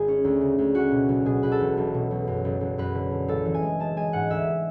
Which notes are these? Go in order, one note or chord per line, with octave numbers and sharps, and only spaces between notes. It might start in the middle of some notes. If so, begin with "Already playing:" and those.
Already playing: G#1 G#4
C#4
D2
C#3
D2
C#4 F#4
B2
B1
B2 G#4
B2 B4
A4
E1
B1
B2
B1
F#2
F#1
F#1
F#2 B4
D3
D3
A1 A4
E3
G#5
G#3
G#3 A5
G#3 G#5
G#2 F#5
D2 E5